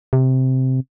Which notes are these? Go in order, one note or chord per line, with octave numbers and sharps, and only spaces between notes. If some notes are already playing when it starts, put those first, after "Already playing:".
C3